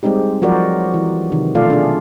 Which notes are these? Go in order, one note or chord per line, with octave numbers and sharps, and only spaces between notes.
G3 G#3 C4 D#4 G4
F3 F#3 F#4 A#4 C5 D5
E3
C3 D#3
B2 A3 F4 A4 D5 F5
D4 G#4